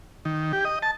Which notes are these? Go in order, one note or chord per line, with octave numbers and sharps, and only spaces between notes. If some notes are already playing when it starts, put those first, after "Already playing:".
D#3
G4
D#5
A5